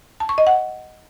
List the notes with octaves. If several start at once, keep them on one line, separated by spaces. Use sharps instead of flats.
A5
C#6
D#5
F#5